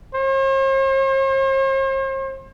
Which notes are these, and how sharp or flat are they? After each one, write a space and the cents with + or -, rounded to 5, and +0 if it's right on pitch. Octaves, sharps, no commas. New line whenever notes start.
C5 +45